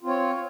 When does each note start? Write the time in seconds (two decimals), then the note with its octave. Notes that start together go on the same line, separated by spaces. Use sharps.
0.01 F4
0.04 C4
0.08 C#5